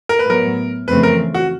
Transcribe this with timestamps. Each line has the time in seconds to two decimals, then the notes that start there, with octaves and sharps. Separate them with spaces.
0.09 A#4
0.19 B4
0.25 A2 F#3 B3 A#4
0.87 F2 C#3 E3 A3 C4 B4
1.03 A#4
1.34 F#4